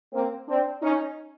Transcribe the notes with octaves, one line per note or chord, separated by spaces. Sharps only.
A#3 C4
C4 D4
C#4 D#4